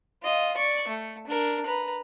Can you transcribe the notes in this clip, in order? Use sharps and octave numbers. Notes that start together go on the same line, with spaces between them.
F4 D#5
D5 C#6
A3
D4 A#4
B4 A#5